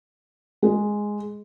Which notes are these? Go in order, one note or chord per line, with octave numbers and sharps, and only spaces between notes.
G#3